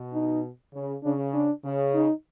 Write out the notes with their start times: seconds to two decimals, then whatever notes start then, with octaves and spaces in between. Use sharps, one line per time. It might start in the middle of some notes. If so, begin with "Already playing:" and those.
Already playing: B2
0.13 D#4
0.73 C#3
1.04 C#3 D4
1.34 D4
1.64 C#3
1.94 D#4